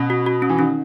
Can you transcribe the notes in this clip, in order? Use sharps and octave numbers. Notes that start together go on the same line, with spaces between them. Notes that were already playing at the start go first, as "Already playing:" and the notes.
Already playing: B2 C#4
F#4
F#4
C#4
E3
D#3 C#4